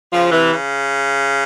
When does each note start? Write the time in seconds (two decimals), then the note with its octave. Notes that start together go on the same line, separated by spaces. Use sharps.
0.12 C#3 F3
0.32 C3 E3
0.51 C#3